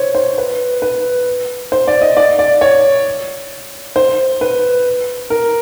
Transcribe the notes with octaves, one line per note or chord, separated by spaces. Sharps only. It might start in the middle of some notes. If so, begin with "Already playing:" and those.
Already playing: C5 C#5
C5
B4
B4
C5
D5
D#5
D5
D5
C#5
C5
B4
A#4